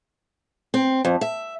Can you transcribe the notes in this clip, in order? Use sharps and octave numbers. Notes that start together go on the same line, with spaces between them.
C4
F2
E5